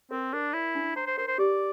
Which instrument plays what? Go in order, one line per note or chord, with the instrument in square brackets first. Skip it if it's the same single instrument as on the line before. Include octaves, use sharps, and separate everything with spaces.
[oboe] C4 [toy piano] A#4
[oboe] D4 [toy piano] A#4
[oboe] E4 [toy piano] D5
[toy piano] D4
[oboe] C5 [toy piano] A#5
[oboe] C5
[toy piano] A#4 [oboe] C5
[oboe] C5
[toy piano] G4 [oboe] D5